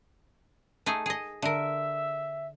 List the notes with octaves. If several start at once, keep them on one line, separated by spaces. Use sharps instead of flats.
A3 D#4 G#4
G#4 D#5
D3 A#4 E5